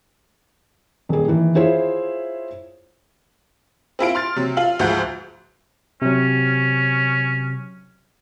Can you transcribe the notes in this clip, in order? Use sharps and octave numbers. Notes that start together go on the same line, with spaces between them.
D#1 G#4
D#3 E3
E4 F4 G#4 C5 C#5 E5
C4 E4 F4 D7
C6 F6 A6
C3 F#3
F4 F5 F#7
D2 G#2 F3 F#5 G6
C3 F#3 C#4